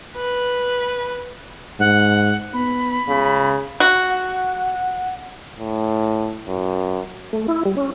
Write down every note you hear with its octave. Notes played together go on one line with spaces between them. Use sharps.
B4
G#2 F#5
B3 B5
C#2 C#3
F#4
F#5
A2
F#2
A3
E4
G3
C#4